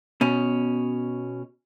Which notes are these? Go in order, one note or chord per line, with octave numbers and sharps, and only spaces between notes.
B2 C#4